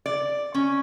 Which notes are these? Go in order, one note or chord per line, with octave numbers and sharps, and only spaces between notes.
D5
C#4